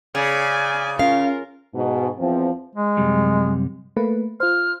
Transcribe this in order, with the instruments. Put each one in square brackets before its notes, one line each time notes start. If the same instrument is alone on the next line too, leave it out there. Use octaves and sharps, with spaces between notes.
[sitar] C#3 [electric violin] D5 G#5
[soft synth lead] C#4 [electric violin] F4 A#4 [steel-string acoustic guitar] F5
[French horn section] G#2 B2
E2 F3 C4
[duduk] G#3
[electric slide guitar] F#2 C3 G3
[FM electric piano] A3 A#3 B4
[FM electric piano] F4 C5 [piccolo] F6